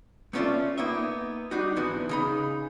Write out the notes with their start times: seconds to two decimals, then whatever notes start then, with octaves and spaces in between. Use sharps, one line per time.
0.33 A3 B3 C#4 F4 D5 E5
0.78 A#3 B3 D#4 E5
1.51 G3 D4 D#4 F#4
1.76 D2 G#2 E3 B3 F#4
2.09 C#3 D#4 B5